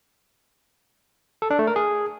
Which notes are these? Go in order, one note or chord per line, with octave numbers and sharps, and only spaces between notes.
A4
D4
A3
A#4
G#4